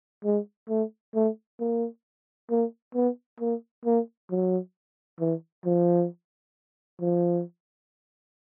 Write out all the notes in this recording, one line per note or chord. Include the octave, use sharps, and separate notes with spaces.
G#3
A3
A3
A#3
A#3
B3
A#3
A#3
F#3
E3
F3
F3